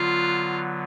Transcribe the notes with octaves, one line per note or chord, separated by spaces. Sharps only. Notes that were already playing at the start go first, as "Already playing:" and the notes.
Already playing: D3 F#3 B3 F4